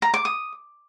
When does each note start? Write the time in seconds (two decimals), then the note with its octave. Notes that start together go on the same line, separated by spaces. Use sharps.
0.02 A#5
0.14 D6
0.25 D#6